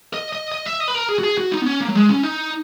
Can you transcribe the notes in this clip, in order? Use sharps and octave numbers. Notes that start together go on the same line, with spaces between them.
D#5
D#5
D#5
E5
D#5
B4
A#4
G#4
F#4
G#4
F#4
D#4
B3
C#4
A#3
F#3
G#3
C#4
D#4